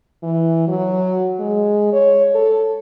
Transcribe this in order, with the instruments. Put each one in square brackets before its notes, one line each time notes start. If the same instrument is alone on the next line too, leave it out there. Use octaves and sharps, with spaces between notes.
[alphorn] E3
F#3
G#3
C#5
A4